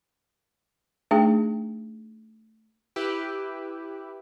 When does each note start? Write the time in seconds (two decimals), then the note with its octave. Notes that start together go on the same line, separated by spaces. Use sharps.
1.11 A3 D4 D#4 G#4 G5
2.96 E4 G4 B4